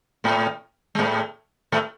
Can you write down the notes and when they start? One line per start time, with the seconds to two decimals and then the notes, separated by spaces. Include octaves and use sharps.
0.24 A2 A3
0.95 G#3
0.99 A2 A3
1.72 A2 A3